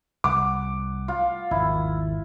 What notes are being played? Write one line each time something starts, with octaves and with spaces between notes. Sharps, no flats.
C2 F#5 D6
F4
G#1 E2 E4